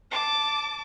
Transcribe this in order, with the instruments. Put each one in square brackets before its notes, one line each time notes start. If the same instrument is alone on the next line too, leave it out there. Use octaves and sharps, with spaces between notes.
[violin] A5 D6